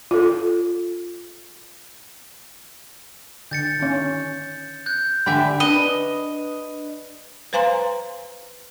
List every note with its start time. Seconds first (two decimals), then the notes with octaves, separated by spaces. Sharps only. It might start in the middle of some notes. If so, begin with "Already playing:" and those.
0.11 F4 A4
3.51 D3 G6 A6 C#7
3.79 D#3 C#4
4.86 F#6 G6
5.26 D3 G4 E5 G#5 B5
5.60 D4 B4 D#5
7.53 B4 C5 F5 G#5 A#5 C6